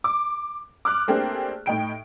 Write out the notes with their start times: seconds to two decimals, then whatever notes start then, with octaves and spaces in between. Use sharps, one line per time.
0.04 D6
0.85 D6 F6 F#6
1.08 A3 A#3 C4 D4 G4 G#4
1.66 A2 D#4 G5 D7